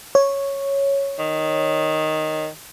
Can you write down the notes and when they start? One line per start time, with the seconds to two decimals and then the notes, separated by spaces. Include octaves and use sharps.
0.15 C#5
1.19 D#3